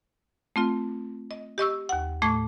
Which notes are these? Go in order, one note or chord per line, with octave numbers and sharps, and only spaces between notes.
A3 C4 F4
D#5
G4 D#5 C#6 E6
D#2 F#5
A2 A3 D6 G#6